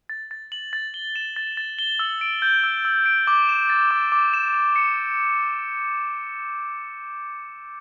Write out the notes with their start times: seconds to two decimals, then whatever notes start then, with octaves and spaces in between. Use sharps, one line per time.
0.09 A6
0.31 A6
0.52 F#7
0.73 A6
0.94 G7
1.16 E7
1.36 A6
1.57 A6
1.79 G7
1.99 E6
2.21 D7
2.42 G6
2.64 E6
2.85 E6
3.06 D7
3.27 D6
3.49 E7
3.70 A6
3.91 D6
4.12 D6
4.34 E7
4.54 E7
4.76 C#7